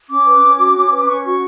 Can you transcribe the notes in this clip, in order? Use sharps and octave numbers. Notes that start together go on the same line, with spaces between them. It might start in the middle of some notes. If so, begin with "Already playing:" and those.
C#4 D6
B4
C#4
F#4
C#4
B4
C#4 C#6
F#4 C#6